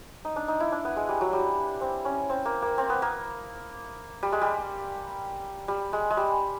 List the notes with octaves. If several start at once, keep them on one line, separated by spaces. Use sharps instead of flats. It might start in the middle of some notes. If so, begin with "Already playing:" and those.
D#4
D4
D#4
E4
D4
B3
G#3
G3
F#3
G3
C4
C#4
C4
A#3
A#3
C4
B3
A#3
G3
G#3
G3
G3
G#3
G#3
G3